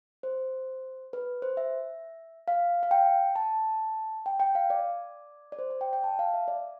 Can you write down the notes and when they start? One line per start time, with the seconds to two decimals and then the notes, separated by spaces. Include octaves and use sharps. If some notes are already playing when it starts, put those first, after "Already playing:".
0.23 C5
1.13 B4
1.42 C5
1.57 E5
2.48 F5
2.83 F5
2.91 G5
3.36 A5
4.26 G5
4.40 G5
4.55 F5
4.70 D5
5.52 D5
5.59 C5
5.70 D5
5.81 G5
5.93 G5
6.04 A5
6.19 F5
6.34 E5
6.48 D5